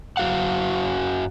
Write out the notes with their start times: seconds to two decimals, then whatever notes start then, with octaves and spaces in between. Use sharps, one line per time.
0.17 F#2 F#3 F#4 F5 F#5